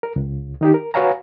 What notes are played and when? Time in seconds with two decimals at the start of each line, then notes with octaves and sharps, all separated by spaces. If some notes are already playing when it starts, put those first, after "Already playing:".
0.03 A#4
0.16 C#2
0.61 D#3 D#4 G4
0.74 A#4
0.94 F#4 B4 C#5 F5 G#5 A#5